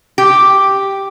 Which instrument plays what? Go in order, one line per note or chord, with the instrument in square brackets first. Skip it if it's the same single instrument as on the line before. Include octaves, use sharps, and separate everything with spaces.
[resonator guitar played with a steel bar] G4